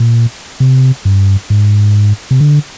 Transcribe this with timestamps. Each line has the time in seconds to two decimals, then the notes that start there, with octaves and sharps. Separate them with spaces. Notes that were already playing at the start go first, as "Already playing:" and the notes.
Already playing: A#2
0.60 C3
1.05 G2
1.50 G#2
2.31 C3
2.41 D3